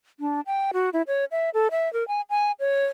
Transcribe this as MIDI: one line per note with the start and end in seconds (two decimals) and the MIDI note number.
0.20 0.41 62
0.46 0.71 79
0.73 0.90 66
0.93 1.02 64
1.07 1.25 73
1.32 1.50 76
1.54 1.68 69
1.71 1.91 76
1.93 2.06 70
2.08 2.21 80
2.30 2.52 80
2.60 2.86 73